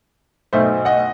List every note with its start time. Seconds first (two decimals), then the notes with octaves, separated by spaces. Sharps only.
0.53 B1 B2 A3 D#4 C5 E5
0.85 D#5 F#5